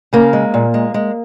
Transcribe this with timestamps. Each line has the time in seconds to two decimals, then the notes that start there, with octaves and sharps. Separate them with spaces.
0.13 C#3 A#3
0.33 G#3
0.54 A#2
0.74 G#3
0.94 G#3